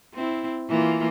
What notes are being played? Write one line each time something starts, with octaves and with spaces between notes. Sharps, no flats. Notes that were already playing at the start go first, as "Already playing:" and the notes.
C4 E4
E3 A#3 F4